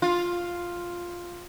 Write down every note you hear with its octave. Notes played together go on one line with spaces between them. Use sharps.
F4